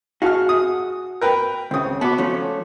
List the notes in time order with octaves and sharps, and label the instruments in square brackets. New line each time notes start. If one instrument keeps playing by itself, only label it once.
[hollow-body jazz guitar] F#4 G#4 [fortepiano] F5 A5 F6
[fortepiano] D#6
A#4 B4 G5
[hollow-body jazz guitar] C#2 C#3 [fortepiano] C4 D#6
[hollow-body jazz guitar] B3 F#4 B4 [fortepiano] A5 D6
[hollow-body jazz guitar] F3 A3 C#4